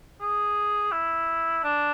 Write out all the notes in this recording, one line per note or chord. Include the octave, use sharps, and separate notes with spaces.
G#4
E4
D4